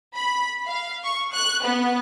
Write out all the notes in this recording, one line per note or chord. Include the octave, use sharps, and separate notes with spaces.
B5
F5
C#6
F#6
B3